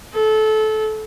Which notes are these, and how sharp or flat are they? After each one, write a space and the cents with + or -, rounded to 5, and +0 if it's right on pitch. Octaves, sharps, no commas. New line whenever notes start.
A4 -25